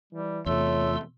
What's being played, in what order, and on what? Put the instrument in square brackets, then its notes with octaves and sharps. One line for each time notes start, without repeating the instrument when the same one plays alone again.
[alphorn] E3 [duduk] G3
[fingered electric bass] E2 C3 [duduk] A3 [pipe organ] F4 C6 E6 [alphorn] C#5